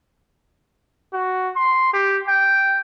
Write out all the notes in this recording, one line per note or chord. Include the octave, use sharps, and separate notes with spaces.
F#4
C6
G4
G5